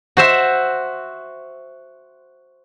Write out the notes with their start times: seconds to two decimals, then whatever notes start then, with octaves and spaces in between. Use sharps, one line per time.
0.17 F#4 C5 E5